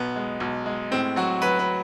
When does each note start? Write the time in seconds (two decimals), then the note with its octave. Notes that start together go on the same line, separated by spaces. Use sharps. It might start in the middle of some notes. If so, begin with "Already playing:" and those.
Already playing: B1 B3
0.16 G#3
0.40 B1
0.66 G#3
0.91 A2 C4
1.16 F#3 F#4
1.42 F#3 B4
1.59 B4